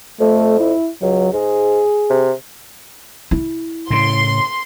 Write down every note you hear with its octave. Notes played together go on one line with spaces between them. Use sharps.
F2 A3
E4
C#2 F#3
G#2 G#4
C3
E4
A2 C#3 C6